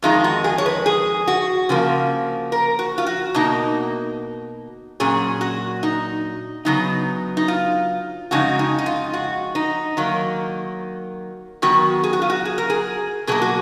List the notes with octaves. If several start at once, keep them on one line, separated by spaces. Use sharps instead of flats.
F2 D#3 G#3 D#4 F4
F#4
G#4
C#5
B4
G#4
F#4
C#3 F3 A#3
A#4
F#4
F4
F#4
B2 A#3 D#4
A#2 F#3 C#4 G#4
F#4
D#4
C#3 F#3 B3 D#4
D#4
F4
F2 C#3 G#3 D#4 F#4
D#4
D#4
F4
F#4
D#4
D#3 F#3 A#3
D#3 F#3 B3 F#4
G#4
F#4
F4
F#4
G#4
A#4
G#4
B2 F#3 A#3 G#4
F#4